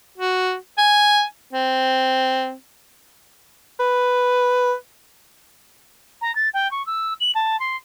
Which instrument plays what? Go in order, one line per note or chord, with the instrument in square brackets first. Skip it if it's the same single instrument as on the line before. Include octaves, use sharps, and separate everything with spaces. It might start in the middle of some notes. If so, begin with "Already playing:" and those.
[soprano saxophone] F#4
G#5
C4
B4
[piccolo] A#5
A6
G5
C#6
E6
F#7
A5
C6